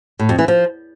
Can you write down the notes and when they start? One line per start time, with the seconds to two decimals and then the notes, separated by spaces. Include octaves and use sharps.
0.19 A2
0.29 F2
0.39 E3
0.48 F3